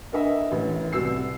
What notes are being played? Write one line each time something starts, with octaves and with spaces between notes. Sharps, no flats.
D4 A#4 D#5 E5
A1
C2 F#4 E6 C7